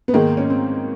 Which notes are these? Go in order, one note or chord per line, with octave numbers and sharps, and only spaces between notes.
B3
G#2 D#3 G#3 A#3
C#4
C4